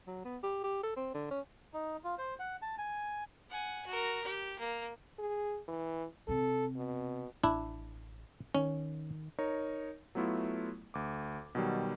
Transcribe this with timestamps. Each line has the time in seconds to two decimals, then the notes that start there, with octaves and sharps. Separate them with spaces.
0.07 F#3
0.25 B3
0.43 G4
0.64 G4
0.83 A4
0.96 C4
1.14 D3
1.31 C#4
1.74 D#4
2.04 F4
2.18 C5
2.39 F#5
2.62 A5
2.78 G#5
3.50 F#5 G#5
3.86 F#4 A#4
4.24 G4
4.59 A#3
5.19 G#4
5.68 E3
6.28 C3 C4 A4
6.76 B2
7.44 A1 D4 E4
8.55 D#3 C#4
9.39 D#4 A#4 C#5
10.15 F#3 A3 B3 E4 F4
10.94 D2 D6
11.55 B2 D#3 F#3 G3